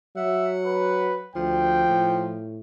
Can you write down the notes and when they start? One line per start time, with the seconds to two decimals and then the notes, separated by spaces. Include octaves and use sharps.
0.17 F#3 E5 F#5
0.66 B4
1.35 D2 F3 G5
1.88 A2